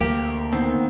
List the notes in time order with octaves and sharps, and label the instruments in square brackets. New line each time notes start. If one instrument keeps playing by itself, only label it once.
[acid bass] D2 [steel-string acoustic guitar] A#3 [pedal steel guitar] G4
[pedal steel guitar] D#3 B3 C4